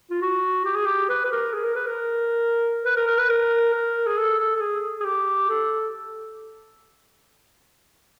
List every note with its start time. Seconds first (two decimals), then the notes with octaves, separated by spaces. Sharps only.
0.10 F4
0.21 F#4
0.65 G4
0.75 G#4
0.86 G4
1.09 B4
1.25 B4
1.32 A#4
1.53 G#4
1.64 A#4
1.75 B4
1.86 A#4
2.85 B4
2.97 A#4
3.07 A#4
3.18 B4
3.29 A#4
3.73 A#4
4.07 G#4
4.17 A4
4.39 A4
4.55 A4
4.61 G#4
5.00 G#4
5.05 G4
5.49 A4